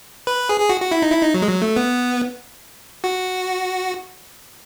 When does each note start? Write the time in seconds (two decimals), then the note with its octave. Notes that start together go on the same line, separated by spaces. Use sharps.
0.27 B4
0.49 G#4
0.60 G#4
0.70 F#4
0.81 F#4
0.92 E4
1.02 D#4
1.12 E4
1.23 D#4
1.34 F#3
1.42 G#3
1.47 F#3
1.62 A3
1.76 B3
3.04 F#4